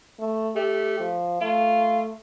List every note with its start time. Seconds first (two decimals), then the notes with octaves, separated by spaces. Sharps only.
0.20 A3
0.56 A3 G4
1.00 F3
1.41 A3 F4